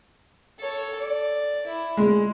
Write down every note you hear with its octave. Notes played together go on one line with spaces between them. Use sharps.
A4 C#5
D5
E4
G#3